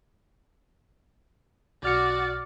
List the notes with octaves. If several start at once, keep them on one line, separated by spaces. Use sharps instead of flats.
B1 F#4 D5 F6 C#7